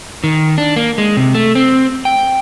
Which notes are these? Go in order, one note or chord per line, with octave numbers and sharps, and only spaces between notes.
D#3
D4
A#3
G#3
C3
A3
C4
G5